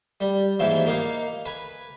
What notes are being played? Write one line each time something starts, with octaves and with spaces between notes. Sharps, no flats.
G3
D#2 G#2 E3 F3
A#3 D#4 F5
B4 G#5